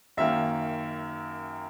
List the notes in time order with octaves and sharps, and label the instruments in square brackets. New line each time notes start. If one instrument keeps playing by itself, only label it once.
[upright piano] F#2 D#3 A#3 E5